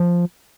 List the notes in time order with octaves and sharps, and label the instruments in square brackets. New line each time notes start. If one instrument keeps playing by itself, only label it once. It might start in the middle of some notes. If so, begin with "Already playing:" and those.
Already playing: [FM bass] F3